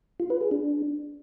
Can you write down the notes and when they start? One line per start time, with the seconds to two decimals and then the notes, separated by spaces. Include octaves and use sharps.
0.20 F4
0.30 B4
0.41 G#4
0.51 D4